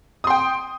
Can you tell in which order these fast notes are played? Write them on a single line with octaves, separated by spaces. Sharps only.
D#6 C6 G5